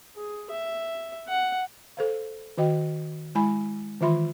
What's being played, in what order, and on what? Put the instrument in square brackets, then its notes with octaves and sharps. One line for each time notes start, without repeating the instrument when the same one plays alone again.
[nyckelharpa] G#4
E5
F#5
[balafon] A4 C5 F5
D#3 F#4 D#5 G5
G#3 E4 G#5 B5
D#3 E3 F4 E5 B5 C6